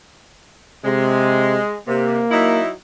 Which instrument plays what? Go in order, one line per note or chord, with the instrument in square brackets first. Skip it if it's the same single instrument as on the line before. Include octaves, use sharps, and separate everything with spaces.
[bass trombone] C3 [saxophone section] G#3
[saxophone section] C3 [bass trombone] A#3
[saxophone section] F#3 D#4 E4